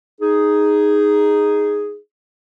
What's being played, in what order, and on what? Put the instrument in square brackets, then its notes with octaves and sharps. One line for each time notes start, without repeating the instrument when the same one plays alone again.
[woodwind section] D#4 G#4